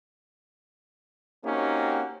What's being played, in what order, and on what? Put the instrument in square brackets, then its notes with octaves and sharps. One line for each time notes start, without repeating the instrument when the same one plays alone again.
[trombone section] A#3 C4 C#4 D#4 F#4 G4